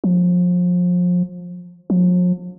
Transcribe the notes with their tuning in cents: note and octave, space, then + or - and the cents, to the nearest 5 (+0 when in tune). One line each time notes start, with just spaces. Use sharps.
F3 +30
F3 +45